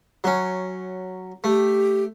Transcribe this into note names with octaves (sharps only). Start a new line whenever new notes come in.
F#3 C#4
A3 G4